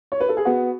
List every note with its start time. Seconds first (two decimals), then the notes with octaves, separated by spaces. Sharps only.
0.12 C#5
0.20 B4
0.29 A4
0.37 G#4
0.45 B3 F#4